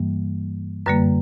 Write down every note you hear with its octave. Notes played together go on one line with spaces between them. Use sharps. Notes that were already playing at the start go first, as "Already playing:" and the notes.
Already playing: G2 E3 G3 A#3
F#2 D3 G3 A#3 B4